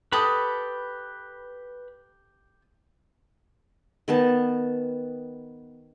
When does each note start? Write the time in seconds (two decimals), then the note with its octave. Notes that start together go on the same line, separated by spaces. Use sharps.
0.12 G4 A4 B4 B5 D#6
4.08 D#3 B3 A5